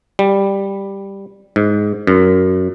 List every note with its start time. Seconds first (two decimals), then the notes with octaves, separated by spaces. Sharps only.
0.19 G3
1.56 G#2
2.07 F#2